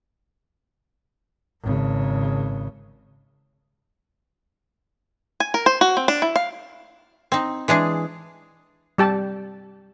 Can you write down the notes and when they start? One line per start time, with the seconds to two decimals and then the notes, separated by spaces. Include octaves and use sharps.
1.62 G#1 C#3
5.40 G#5
5.54 A#4
5.66 C5
5.81 F#4
5.97 C4
6.08 D4
6.22 E4
6.36 F5
7.32 C4 D#4
7.68 E3 G#3 D4 G#4
8.98 G3 G4 A5